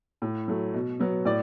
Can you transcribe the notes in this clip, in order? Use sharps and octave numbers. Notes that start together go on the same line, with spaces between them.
A2
F#3 A3
B2
F#3 B3
A2 D5